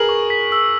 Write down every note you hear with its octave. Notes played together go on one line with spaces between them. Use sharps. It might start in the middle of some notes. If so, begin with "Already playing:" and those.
Already playing: G#4 A#4 B4 F#7
C#6
B6
E6